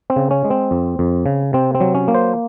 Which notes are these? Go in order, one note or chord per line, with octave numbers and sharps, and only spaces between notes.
C4
C#3
C#4
G#3
C4
F2
F2
C#3
C3 C4
C4
F#3
C#4
A#3
C5